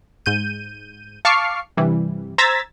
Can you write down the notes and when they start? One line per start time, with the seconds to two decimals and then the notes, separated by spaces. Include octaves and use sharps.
0.26 G#2 G6 D#7
1.25 F5 A5 C#6 D6 F6 C7
1.77 G2 C3 E3 G3
2.38 C5 A#5 E6 G#6 A6 B6